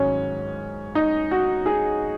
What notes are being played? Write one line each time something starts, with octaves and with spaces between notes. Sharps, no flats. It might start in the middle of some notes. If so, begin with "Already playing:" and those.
Already playing: G#2 D#3 F#3 C#4
D#4
F#4
G#4